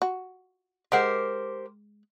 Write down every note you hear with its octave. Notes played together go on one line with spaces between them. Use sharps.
F#4
G#3 G4 A#4 C5 F#5